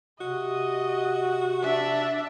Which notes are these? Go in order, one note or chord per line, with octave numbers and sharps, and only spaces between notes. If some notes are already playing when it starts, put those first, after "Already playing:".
C3 F#4 D#5
D4 E5 A5